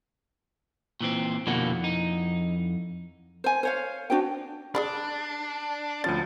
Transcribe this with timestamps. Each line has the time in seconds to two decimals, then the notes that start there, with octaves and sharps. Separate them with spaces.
1.01 A#2 E3 C4
1.47 F2 B2 D3 A#3 E4 F#5
1.84 D#4
3.44 C5 G#5
3.63 C5 C#5 F5
4.10 D4 F#4 C5 G5
4.75 D4 G#4 D5 B5
6.04 D2 F3 C#4 A6